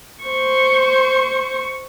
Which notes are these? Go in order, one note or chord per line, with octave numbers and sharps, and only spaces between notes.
C5 C#6